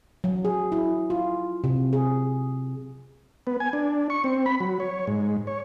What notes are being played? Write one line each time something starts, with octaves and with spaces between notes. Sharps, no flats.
F#3
G#4
E4
F4
C3
G#4
B3
G#5
D4
C#6
C4
B5
F#3
C#5
G#2
C#5